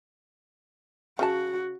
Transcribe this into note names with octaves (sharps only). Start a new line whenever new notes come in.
C#3 C#4 F#4 A5